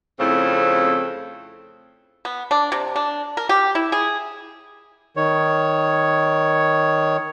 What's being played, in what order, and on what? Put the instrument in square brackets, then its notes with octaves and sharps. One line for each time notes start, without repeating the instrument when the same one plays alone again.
[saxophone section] F2 C#3 A3 C4 E4
[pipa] B3
D4
C3
D4
A#4
G4
E4
G#4
[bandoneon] D#3 C#5